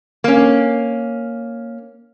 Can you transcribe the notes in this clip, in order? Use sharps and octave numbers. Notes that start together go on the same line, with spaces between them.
A#3 C#4